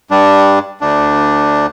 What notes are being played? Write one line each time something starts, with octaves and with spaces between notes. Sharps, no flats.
G2 G3 D4
D2 D4